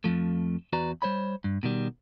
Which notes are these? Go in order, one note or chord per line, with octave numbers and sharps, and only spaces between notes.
F2 E3 F3 A3
E2 F#4 B4 D5 A#5
G3 C5 C#5 B5
G2
B2 D#3 G3